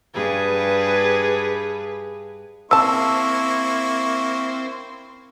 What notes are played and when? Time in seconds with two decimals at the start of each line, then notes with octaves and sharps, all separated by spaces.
0.14 G2 G#4 B4
2.71 C#3 A#3 C4 E4 A5 C#6 E6